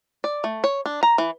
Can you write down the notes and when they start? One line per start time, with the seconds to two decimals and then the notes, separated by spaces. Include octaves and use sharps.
0.24 D5
0.44 A3
0.64 C#5
0.86 D4
1.03 A#5
1.18 E3